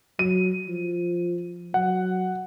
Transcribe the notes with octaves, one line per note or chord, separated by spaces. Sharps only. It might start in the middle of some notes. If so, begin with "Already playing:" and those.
F#3 D#7
F3
F#3 F#5